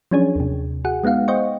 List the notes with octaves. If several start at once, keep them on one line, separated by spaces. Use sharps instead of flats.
F3 F#3 C#4 D4 G#4 C#5
D#2 C3
F#4 G#4 F#5
G#3 B3 D#4 F5 F#5
C5 D#5 G5 C#6